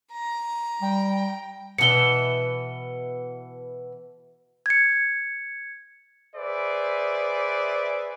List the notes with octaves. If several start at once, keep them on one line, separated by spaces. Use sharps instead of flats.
A#5
G3 G5
B2 E3 E5 C#7 G7
G#6 C#7
G#4 B4 C5 D5 E5